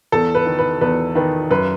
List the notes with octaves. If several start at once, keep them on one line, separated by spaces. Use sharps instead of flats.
E2 A4
B4
D#3
B4
E2 B4
D#3 B4
F#2 B4